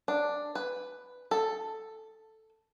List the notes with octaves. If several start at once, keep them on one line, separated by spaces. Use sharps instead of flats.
D4
B4
A4